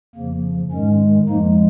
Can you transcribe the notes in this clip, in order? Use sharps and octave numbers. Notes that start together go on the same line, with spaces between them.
F2 C#3 F3 A#3
G#2 D#3 G#3 C#4
F2 F3 G#3 A#3 D#4